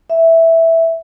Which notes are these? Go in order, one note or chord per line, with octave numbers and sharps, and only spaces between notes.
E5